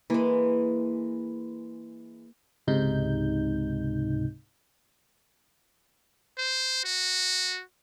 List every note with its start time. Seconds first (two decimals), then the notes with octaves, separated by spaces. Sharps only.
0.10 E3 G#3 A#3
2.67 C#2 G#2 C3 D#4 G6
6.39 C5
6.85 F#4